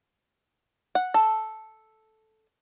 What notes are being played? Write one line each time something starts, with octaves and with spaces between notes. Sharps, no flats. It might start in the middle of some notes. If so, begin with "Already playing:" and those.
F#5
A4